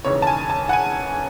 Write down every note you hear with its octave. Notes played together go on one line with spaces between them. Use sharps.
E1 D#2 C#3 E3 C#5
A5
G#5
A5
F#5
G#5